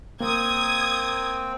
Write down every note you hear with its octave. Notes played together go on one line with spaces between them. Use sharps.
A#3 C4 D#6 G#6